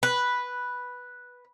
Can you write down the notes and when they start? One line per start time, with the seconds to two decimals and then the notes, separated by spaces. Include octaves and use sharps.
0.03 B4